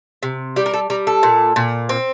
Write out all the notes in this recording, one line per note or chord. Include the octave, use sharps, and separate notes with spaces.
C3
G3 G4
A#4
A4
G3 A#4
A4
A#2
A#2
C4